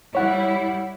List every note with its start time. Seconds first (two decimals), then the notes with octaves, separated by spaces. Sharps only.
0.15 G3 E4 C#5 F#5